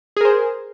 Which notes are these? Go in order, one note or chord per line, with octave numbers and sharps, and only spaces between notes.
G#4 A#4 C5